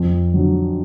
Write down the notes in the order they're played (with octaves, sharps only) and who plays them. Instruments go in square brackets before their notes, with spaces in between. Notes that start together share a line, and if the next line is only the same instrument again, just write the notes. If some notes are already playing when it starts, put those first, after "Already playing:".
Already playing: [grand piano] F2
D3 F#3